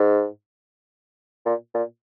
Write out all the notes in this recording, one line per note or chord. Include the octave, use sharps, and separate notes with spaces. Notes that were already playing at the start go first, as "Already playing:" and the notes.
Already playing: G#2
A#2
A#2